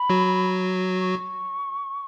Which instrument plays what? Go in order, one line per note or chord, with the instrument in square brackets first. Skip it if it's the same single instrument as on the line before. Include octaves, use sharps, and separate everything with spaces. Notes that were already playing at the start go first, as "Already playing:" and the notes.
Already playing: [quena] B5
[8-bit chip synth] F#3 F#4
[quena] C#6